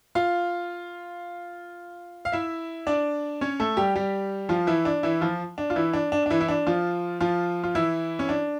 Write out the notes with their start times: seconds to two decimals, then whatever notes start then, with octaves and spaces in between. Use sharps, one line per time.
0.15 F4 F5
2.25 F5
2.32 E4 E5
2.87 D4 D5
3.41 C#4 C#5
3.60 A3 A4
3.77 G3 G4
3.96 G3 G4
4.49 F3 F4
4.67 E3 E4
4.85 D4
5.03 E3 E4
5.21 F3 F4
5.58 D4
5.70 F4
5.76 E3 E4
5.93 D4
6.12 D4
6.26 D4
6.30 E3 E4
6.41 E4
6.48 D4
6.66 F3 F4
7.20 F3 F4
7.64 F4
7.75 E3 E4
8.19 C#4
8.29 D4